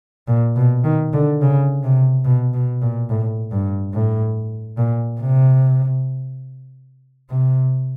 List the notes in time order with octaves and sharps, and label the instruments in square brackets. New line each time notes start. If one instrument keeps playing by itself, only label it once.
[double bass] A#2
B2
D#3
D3
C#3
C3
B2
B2
A#2
A2
G2
A2
A#2
C3
C3